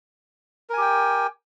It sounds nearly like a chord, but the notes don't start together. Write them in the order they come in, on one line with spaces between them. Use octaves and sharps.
A#4 G#5 G4 G5